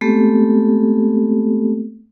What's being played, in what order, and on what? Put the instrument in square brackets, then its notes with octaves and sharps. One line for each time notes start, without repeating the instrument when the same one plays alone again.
[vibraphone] G#3 A3 B3 C4 G4 A4